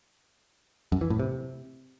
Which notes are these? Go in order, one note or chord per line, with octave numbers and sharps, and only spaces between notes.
F#2
E3
A2
C3